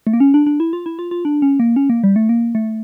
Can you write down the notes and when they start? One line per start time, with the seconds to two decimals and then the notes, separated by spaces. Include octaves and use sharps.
0.07 A3
0.13 A#3
0.20 C#4
0.34 D4
0.47 D4
0.60 E4
0.73 F4
0.86 E4
0.99 F4
1.11 F4
1.25 D4
1.42 C#4
1.60 A#3
1.76 C#4
1.90 A#3
2.04 G3
2.16 A3
2.29 A#3
2.55 A3